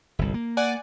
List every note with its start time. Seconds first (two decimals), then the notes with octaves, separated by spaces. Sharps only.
0.19 G1 C2
0.34 A#3
0.57 D5 F#5 G#5